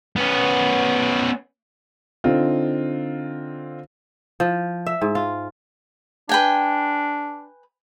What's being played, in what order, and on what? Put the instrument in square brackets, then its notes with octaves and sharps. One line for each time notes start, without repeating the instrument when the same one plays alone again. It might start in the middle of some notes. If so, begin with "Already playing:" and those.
[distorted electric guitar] B3 C#4
[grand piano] D3 C4 D#4 F4
[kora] F3
E5
G#2
F4
[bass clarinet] D4 [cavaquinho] B4 G5 G#5